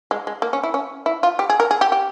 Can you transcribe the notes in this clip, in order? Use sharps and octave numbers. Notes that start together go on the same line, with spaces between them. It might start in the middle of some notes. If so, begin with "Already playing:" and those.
G#3
G#3
A#3
C#4
E4
C#4
E4
F4
G4
G#4
A#4
G#4
G4
G4